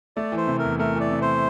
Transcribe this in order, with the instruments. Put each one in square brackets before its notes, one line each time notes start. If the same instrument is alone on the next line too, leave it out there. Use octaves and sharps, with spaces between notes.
[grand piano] A3 [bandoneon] D5
[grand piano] E3
[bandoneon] C5
[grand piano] C3
[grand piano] E2 [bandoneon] A#4
[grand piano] A3 [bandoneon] A#4
[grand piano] E3 [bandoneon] D5
[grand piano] C3
[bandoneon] C5